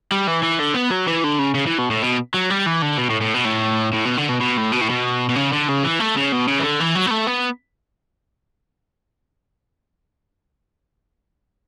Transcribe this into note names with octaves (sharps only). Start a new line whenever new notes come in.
G3
E3
E3
D3
B3
F#3
E3
D3
C#3
C#3
E3
B2
A2
B2
F#3
G3
E3
D3
B2
A2
A2
B2
A2
A2
B2
D3
B2
B2
A2
B2
A2
B2
B2
C#3
D3
C#3
E3
A3
C#3
B2
C#3
E3
D3
E3
F#3
B3
A3
B3